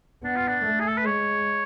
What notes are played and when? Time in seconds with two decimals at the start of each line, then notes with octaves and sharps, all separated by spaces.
0.24 B3 D4
0.36 F4
0.48 D4
0.66 A3
0.80 G#4
0.88 A4
0.98 B4
1.06 G#3 C#5